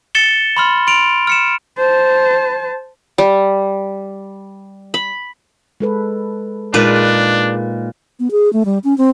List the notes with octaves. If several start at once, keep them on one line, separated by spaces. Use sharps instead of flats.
A6 C#7 E7 G7
B5 C6 F6
C6 D7 F7
F6 C#7 E7
C5 A5
G3
B5
G#3 A4 B4
A#2 G#3 A#3 D4 D#4 B4
B3
G#4
A3
G3
C#4
C4